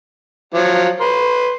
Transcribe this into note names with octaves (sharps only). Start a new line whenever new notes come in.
F3 F#3
B4 C6